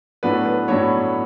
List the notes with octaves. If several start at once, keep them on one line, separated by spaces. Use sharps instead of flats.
A2 F#3 B3 D4 B4
B4
A2 F#3 B3 D4 C#5